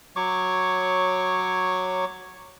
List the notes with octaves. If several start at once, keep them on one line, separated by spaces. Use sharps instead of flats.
F#3 C#5 C#6 D6